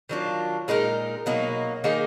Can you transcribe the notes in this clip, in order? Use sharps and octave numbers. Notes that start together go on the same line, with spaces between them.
D#3 F#3 D4 F4
A#2 G#3 D#4 A#4
B2 F#3 A#3 D#4
D#3 A#3 D#4 G#4